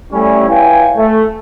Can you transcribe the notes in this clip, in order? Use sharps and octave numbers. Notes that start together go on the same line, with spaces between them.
G3 A3 C#4 E4
E4 B4 C#5 F5 G5 G#5
A3